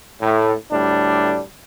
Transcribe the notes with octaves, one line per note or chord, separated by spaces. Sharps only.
A2
D2 A2 G3 D4